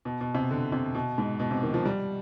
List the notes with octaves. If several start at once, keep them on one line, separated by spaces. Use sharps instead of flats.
B2
B2
C3
D3
C3
B2
G#2
B2
C3
D#3
F3
G3